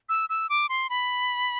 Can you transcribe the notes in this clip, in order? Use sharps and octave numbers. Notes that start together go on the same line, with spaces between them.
E6
E6
D6
C6
B5